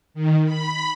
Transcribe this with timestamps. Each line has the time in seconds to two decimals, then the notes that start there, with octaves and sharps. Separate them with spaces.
0.14 D#3
0.45 B5